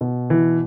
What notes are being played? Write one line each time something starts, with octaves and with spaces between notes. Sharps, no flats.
B2
E3